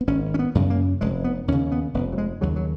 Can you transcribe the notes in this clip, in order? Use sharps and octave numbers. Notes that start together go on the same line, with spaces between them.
B3
G#1 C#4
C#4
B3
F#2 C#3
A#3
F1 G#3
B3
D#2 C#3 C#4
B3
F1 B3
F#3
G#3
D#2 C#3 F#3
F#3